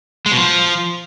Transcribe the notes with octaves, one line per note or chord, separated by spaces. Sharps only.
G#3
B2
F3